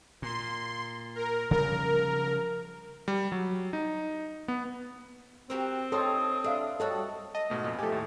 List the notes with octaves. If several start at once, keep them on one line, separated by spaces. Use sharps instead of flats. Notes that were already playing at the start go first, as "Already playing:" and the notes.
A#2 C6
A#4
C#3 F3 G3 A#4
G3
F#3
D#4
B3
C4 F#4 G4 A#4
D#4 G4 A4 C5 C#5 C6 D#6
D4 A4 E5 F5
G3 F#4 A4 C#5 D#5
D#5 A5
G#2 B2 A3
F2 A#2
F3 A3 G4 G#5
D#2 A2